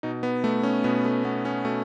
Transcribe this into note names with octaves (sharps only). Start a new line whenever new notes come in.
B2 D#4
B3
A3
C#4
B2 B3
A3
B3
C#4
B2 A3